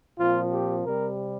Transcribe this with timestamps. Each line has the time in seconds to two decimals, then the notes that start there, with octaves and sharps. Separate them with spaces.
0.18 A#2 F3 C4 F4
0.52 G4
0.85 C3 G3 C4 A#4